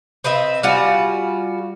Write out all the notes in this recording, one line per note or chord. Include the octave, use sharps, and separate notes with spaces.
C4 B4 D#5 E5
G3 F4 F#4 G#5